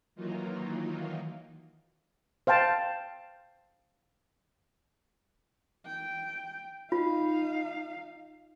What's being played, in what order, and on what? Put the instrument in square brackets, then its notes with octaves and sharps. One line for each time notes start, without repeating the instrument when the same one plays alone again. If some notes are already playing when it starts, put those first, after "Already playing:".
[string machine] D#3 E3 F#3 A#3 D#4 F4
[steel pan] C5 F5 G5 A5
[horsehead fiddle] G5
[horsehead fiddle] D#4 F5 [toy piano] F4